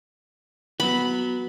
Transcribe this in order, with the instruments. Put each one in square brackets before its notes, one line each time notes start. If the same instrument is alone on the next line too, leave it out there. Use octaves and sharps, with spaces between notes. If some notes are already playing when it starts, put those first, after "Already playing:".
[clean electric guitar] F#3 B3 [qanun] B5